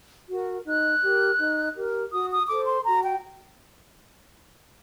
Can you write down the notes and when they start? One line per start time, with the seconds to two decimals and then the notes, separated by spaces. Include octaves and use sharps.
0.29 F#4 A#4
0.65 D#4 F#6
1.01 G4
1.06 A#4
1.39 D#4
1.75 G4 A#4
2.11 F#4 D#6
2.29 D#6
2.47 A4 C5 D6
2.66 C6
2.84 F#4 A#5
3.03 G5